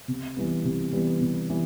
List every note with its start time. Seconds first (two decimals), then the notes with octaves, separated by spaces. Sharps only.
0.08 C3
0.36 E3 G3 B3
0.65 C3
0.92 E3 G3 B3
1.21 C3
1.49 E3 G3 B3